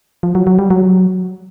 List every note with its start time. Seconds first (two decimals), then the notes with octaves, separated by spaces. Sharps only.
0.23 F3
0.35 F#3
0.47 F#3
0.59 G3
0.70 F#3